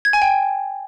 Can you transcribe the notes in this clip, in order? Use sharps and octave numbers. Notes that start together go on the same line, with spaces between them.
G#6
G#5
G5